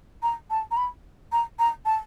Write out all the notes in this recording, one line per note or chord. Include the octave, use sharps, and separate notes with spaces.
A#5
A5
A#5
B5
A#5
A#5
A5